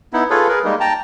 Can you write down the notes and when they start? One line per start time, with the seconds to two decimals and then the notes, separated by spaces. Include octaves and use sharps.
0.13 B3 D#4 E4
0.30 F4 G#4 A4 B4 C#5
0.48 G#4 A#4 B4
0.64 G3 G#3 A#3 D#4
0.80 G5 A5 A#5